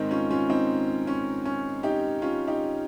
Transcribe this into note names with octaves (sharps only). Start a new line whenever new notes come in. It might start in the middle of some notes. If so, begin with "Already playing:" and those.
Already playing: G#2 D#3 C4 D#4
C#4 F4
C#4 F4
C4 D#4
C#4
C#4
D#4 G4
C#4 F4
D#4 G4